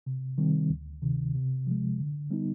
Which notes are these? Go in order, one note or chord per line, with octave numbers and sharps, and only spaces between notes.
C3
D#3 G3 C4
D2
C3 D#3
C3
F3 G#3
D3
G3 B3 D#4